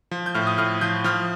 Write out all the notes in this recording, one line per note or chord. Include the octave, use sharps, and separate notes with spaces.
F3
G6
A2 F6
D#6
A2 F6
F3 G6
F3 F6